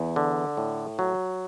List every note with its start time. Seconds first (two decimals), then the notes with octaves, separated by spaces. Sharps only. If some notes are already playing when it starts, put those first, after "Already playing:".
Already playing: E2
0.16 D3
0.57 A2
0.99 F#3